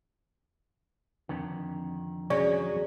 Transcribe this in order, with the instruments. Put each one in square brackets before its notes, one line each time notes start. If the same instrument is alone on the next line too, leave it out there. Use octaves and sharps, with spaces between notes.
[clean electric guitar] F2 D3 D#3
[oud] F#3 G#3 C#4 [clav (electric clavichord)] C#5 [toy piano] D5